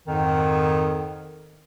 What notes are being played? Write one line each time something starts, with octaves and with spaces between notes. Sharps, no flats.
F2 G#2 D#3